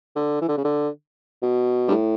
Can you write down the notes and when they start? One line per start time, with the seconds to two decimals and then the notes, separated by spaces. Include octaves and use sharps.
0.16 D3
0.42 E3
0.48 D3
0.57 C#3
0.64 D3
1.42 B2
1.88 G2
1.92 A2